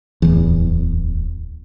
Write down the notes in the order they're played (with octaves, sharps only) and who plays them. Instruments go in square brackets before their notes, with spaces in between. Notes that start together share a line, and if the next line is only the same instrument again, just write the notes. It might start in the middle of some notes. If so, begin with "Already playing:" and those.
[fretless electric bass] D1 E2